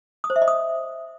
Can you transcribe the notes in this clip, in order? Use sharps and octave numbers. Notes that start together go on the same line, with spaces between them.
D#6
C5
E5
D#5
D#6